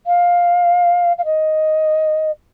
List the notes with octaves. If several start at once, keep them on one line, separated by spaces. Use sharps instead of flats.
F5
F5
D#5